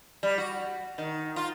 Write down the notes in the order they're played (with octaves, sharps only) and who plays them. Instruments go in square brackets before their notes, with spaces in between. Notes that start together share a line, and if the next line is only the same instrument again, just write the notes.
[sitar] G3
F#4
D#3
F4